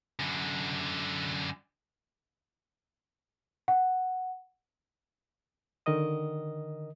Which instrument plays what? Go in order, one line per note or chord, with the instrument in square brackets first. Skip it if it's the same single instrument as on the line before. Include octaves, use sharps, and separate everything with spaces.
[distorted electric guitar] F#2 D3
[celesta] F#5
[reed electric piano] D3 D#3 A#4 D#5 D#6